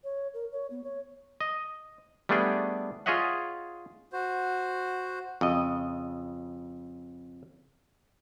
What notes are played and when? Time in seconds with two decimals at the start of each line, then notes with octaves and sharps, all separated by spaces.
0.04 C#5
0.34 A#4
0.52 C#5
0.70 B3
0.84 C#5
1.41 D#5
2.29 G3 A3 B3 D4 G#4 G5
3.06 F4 G#4 C#5 D#5 E5 F#5
4.13 F#4 C5
5.41 F2 C#3 D#5